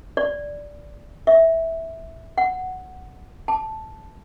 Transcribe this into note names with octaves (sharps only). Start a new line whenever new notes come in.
D5
E5
F#5
A5